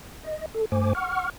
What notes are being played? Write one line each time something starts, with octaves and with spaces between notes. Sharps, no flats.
D#5
A4
G2 A3 C5 G#5 D6
F#5 C#6 F6